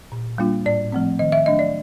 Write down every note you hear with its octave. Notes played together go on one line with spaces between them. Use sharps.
A#2
G3 A#3 D4 F4
A2 D5
F3 A3 C4
D#3 D#5
E5
F#3 A3 D4 D#5
D5